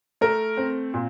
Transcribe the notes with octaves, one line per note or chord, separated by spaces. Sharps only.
A3 A#4
C4
A#2